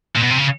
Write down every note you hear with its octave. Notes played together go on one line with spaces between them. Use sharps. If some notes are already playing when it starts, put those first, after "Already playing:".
A#2
B2
C3
C#3